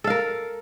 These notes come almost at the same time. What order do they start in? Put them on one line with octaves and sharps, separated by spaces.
A4 F5 A#4